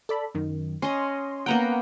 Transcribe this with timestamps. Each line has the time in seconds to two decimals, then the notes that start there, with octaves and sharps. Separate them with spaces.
0.09 A4 D5 B5
0.35 F#2 D#3
0.82 C#4 D#5 C6
1.46 A#3 B3 F#5 G5 A#5